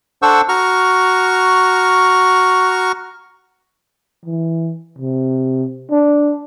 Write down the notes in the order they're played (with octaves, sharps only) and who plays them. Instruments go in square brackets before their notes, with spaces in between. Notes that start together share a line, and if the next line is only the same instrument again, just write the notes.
[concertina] D4 A4 C5 F#5 C#6 E6
F#4 A#5 C#6 F6
[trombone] E3
C3
D4